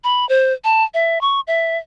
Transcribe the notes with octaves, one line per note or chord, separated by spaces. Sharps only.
B5
C5
A5
E5
C#6
E5